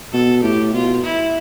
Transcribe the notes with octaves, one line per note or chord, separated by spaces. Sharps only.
B2 A4
A2 G4
B2 F4
E4